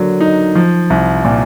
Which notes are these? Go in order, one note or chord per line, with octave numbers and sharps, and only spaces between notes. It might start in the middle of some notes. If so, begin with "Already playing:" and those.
Already playing: D3 F#3 A#3
D#4
F3
C2
A#2